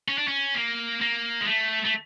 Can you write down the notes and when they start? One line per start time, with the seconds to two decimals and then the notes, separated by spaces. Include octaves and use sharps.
0.08 C#4
0.18 D4
0.28 C#4
0.55 A#3
1.01 A#3
1.41 G#3
1.46 A3
1.85 A3